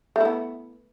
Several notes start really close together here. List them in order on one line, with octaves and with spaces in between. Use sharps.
A3 E4 B3